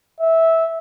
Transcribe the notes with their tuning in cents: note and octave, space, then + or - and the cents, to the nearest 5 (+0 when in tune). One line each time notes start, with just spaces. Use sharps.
E5 -15